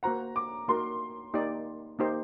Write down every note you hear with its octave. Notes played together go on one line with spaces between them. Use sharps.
A#3 F#4 C5 F#5 A#5
D6
A#3 D#4 F#4 A#4 C6
A#3 D#4 G4 D5
A#3 D#4 G4 C5